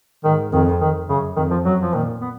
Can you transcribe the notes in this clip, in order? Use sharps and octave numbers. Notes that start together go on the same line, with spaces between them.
G#2 D#3
F2 D#3
D#3
F#2 C#3
F2 D#3
F3
F#2 F#3
F3
A#2 D#3
B3